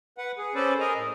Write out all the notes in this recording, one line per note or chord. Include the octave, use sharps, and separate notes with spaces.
B4 F#5
G#4
C4 C#4 A4 B4 C5 D5
G#4 A#4 D#5 G#5 A#5
A2